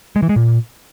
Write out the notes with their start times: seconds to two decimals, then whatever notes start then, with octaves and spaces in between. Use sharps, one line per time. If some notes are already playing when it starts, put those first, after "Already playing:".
0.16 G#3
0.23 E3
0.29 G#3
0.36 A#2